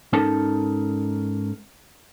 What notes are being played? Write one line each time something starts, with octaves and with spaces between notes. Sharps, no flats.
G#2 C#4 D#4 A4 A#4 A5